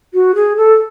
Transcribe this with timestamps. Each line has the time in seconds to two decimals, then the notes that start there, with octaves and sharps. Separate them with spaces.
0.14 F#4
0.35 G#4
0.57 A4